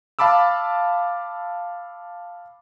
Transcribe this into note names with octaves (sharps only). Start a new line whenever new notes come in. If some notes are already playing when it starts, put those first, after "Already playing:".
F5 A5 B5 D6 E6